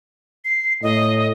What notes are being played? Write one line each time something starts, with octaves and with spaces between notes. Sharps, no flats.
C7
A2 D#5